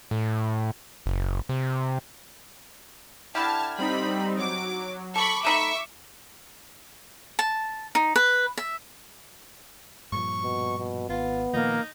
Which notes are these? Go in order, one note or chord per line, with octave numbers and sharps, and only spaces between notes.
A2
F#1
C3
D3 E4 G4 A5 F6 G#6
G3 C4 D#4 B5
F#3 D6
A4 B5 C#6 D6
A3 D#4 E5 B5 C#6
A5
D#4
B4
E5
G2 A#2 F3 C#6
B2
B2
G#1 B3 F4
A#2 D#3 F3 A#3 D#4